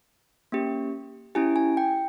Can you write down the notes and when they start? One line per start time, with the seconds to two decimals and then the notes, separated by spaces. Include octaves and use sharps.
0.52 A#3 C#4 G4
1.35 C#4 E4 G4 G#5
1.56 G#5
1.77 G5